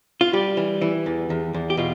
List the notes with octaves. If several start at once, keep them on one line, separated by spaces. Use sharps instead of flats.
F4
G3 G4
E3
E3
E2
E2
E2
G4
B2 F4